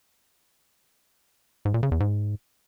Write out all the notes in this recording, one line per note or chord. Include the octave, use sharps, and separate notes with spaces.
G#2
A#2
C#3
E2
G#2